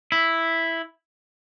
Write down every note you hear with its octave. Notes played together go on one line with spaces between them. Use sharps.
E4